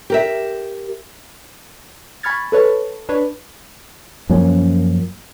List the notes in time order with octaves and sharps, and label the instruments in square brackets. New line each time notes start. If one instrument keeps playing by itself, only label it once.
[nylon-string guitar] G4 A#4 E5
[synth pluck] G#5 B5 C#6 F6 G#6 A6
A4 B4 C#5 A5
D4 B4 C#5
[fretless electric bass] F#2 F3 A#3 C#4